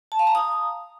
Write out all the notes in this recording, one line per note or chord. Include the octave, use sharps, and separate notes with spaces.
A5
F5
A#5
D#6